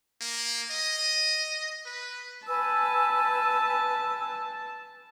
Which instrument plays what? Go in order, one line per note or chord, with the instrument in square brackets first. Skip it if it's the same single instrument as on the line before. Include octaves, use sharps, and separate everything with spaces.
[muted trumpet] A#3
D#5
B4
[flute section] B4 G#5 E6 [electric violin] A5